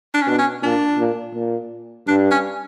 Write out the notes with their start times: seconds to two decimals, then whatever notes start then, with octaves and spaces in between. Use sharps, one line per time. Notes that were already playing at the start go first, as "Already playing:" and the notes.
0.14 D4
0.22 C#4
0.27 B2 D4
0.39 C#4
0.63 A#2 D4
0.98 A#2
1.34 A#2
2.08 G2 D4
2.31 C#4